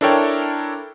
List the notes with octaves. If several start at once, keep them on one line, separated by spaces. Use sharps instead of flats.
D4 E4 A4 A#4 C#5 G5